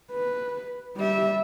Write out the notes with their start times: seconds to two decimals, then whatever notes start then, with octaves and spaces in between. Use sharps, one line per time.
0.12 B4
0.96 G3 E5